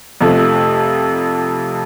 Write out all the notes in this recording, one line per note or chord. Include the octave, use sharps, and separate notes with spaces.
F2 C3 F3 A3